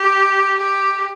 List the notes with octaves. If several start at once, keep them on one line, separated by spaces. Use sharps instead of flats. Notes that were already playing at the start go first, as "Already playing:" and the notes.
Already playing: G4
G4